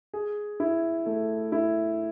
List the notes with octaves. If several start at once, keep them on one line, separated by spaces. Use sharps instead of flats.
G#4
E4
A3
E4